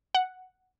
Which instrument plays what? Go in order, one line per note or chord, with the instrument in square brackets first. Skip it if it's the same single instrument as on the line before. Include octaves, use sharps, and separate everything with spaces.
[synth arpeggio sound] F#5